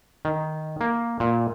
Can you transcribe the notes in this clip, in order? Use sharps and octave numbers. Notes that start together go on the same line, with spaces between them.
D#3
A#3
A#2